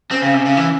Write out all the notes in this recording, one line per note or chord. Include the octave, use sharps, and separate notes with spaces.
C4 C#4
C#3
C3
C#3
E3